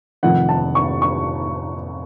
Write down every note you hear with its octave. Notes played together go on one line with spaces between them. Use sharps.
F1 F2 D#3 F#5
A5
C#6
C#6